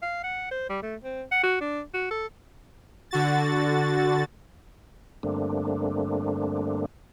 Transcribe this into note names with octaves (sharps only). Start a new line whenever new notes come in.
F5
F#5
C5
G3
A3
C4
F#5
F#4
D4
F#4
A4
D3 F#4 A6
G2 D3 A3 A#3 C4 D4